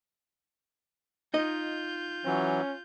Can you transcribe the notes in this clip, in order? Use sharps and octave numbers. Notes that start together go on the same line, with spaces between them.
D#4 F4 D#5 G6
E3 F#3 C#4